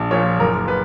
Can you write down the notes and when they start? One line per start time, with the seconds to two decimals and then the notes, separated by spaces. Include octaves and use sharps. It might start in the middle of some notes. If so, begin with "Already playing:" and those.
Already playing: A#1
0.11 A#2 F3 C#5
0.39 F#1 A#4
0.68 B4